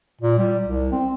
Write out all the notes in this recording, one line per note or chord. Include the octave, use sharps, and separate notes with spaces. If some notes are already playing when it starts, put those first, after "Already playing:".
A#2
G3
C2
C4